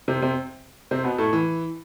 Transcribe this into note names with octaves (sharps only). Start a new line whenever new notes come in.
C3 C4
C3 C4
C3 C4
B2 B3
A2 A3
E3